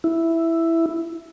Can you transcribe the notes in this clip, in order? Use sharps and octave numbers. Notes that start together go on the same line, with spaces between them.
E4